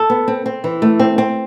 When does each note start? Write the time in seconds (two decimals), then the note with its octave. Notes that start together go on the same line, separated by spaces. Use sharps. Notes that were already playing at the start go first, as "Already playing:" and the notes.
Already playing: A4
0.10 B3
0.28 C4
0.46 C4
0.64 E3
0.82 A3
0.99 C4
1.18 C4